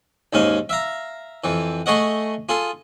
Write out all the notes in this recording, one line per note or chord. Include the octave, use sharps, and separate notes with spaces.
D#2 G#2 C#4 F5
E5 F5 A#5
F2 E3
A3 G#4 C#5 D#5 F#5
F4 G#4 A4